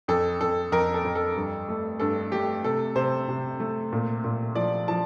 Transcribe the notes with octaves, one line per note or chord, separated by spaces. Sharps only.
F2 A4
F2 A4
F2 A#4
A4
F2
A4
G2
A3
G2 A4
A3 G4
C3 A4
C3 C5
C3
A3
A#2
A#2
F3 D5
F3 A5